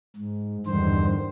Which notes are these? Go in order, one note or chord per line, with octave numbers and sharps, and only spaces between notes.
G#2
E2 G2 D3 D#3 C5